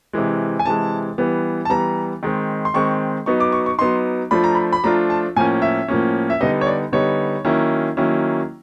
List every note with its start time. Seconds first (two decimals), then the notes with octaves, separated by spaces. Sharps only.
0.13 C3 E3 G#3
0.59 G#5
0.65 C3 E3 G#3 A5
1.18 E3 G3 B3
1.65 A5
1.70 E3 G3 B3 A#5
2.23 D#3 G#3 C4
2.65 C6
2.74 D#3 G#3 C4 C#6
3.26 F#3 B3 D#4 C#6
3.40 D6
3.52 C#6
3.66 C#6
3.79 F#3 B3 D#4 C6
4.31 F3 A3 D4 F4 B5
4.44 A#5
4.55 B5
4.73 B5
4.84 F3 A3 D4 F4 A#5
5.10 A5
5.36 A2 F3 A#3 C#4 G#5
5.62 E5
5.88 A2 F3 A#3 C#4
6.30 E5
6.41 D3 G3 B3 D#4 D#5
6.61 C#5
6.67 D5
6.92 D3 G3 B3 D#4 C#5
7.45 D#3 F#3 A#3 C#4 E4
7.97 D#3 F#3 A#3 C#4 E4